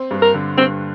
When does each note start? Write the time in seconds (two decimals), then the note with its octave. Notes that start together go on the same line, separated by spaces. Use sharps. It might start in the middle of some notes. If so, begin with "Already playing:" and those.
Already playing: C4
0.11 G2
0.22 A#4
0.34 D3
0.57 G2 C4